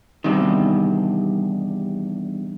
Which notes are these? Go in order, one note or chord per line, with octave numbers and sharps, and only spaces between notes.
E2 G2 C3 D#3